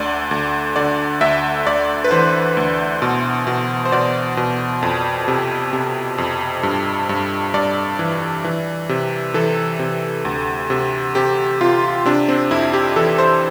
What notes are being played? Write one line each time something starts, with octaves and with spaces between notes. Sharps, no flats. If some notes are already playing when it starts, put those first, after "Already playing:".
Already playing: D2 D3 D5
D2
D3 D5
D2 E5
D2 D5
B4
E3 C5
D2
B2
B2
C5
B2 D5
B2
F2
C3
C3
F2
G2
G2
G2 D5
E3
E3
C3
E3 A4
C3
D2
C3
C3 G4
C3 F4
C3 D4
C4
F2 E4
G4
E3 A4
C5